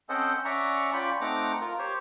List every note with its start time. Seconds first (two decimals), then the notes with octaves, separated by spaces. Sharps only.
0.09 C4 C#4 A4 C5 D#5 F#5
0.45 C#4 D5 E5 F#5 A#5 C#6
0.93 C#4 F4 D5 G5 B5 C#6
1.21 A3 C4 D#4 F#5 A#5 D6
1.61 F4 A#4
1.79 G4 C5 C#5